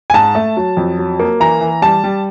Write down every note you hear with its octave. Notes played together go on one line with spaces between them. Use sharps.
G#5
G#2 A5
A3
F#3
F2
F#3
A#3
E3 A#5
E3
G3 A5
G3